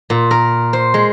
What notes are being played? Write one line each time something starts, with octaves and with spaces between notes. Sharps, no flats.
A#2
A#4
C5
G#3